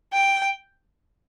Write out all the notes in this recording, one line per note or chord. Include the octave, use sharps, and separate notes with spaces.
G5